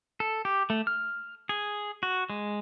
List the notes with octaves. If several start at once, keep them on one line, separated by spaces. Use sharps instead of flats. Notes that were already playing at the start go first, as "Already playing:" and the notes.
A4
G4
A3
F6
G#4
F#4
G#3